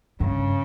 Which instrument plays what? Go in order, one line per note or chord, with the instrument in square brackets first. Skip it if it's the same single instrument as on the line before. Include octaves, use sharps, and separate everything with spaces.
[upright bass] G2 [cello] C#3